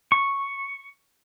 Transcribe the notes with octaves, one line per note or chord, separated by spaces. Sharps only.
C#6